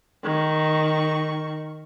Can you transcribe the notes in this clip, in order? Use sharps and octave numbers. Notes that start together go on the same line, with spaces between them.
D#3 C#6